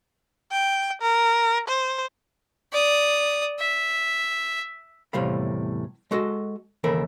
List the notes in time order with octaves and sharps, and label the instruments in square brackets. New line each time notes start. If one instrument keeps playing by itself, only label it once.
[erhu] G5
A#4
C5
[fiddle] D5 D#6
E5
[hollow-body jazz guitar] E2 A2 C3 G3 F5 B5
G#3 F#4 A4 D#5
D#2 C#3 E3 A4 A#4 B5